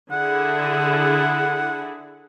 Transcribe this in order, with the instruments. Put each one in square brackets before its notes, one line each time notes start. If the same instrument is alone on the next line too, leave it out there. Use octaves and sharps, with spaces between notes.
[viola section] D3 E4 G#4 [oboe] F#5